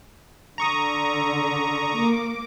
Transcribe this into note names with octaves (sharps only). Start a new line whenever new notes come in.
D3 A#5 C#6 D#6
A#3 D6